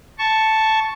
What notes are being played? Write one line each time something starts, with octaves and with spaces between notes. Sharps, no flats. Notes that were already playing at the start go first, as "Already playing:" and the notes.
A5 C#6